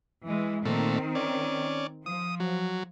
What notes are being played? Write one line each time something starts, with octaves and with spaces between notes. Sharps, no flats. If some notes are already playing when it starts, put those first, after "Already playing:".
E3 G#3
A#2 D#3 A3 C4
C#4 D5
F3 D#6
F#3